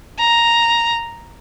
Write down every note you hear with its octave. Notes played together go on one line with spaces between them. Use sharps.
A#5